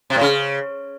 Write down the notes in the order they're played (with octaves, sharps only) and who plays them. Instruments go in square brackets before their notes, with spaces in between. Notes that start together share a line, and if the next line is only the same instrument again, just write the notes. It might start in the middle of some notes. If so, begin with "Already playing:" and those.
[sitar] C3
A2
C#3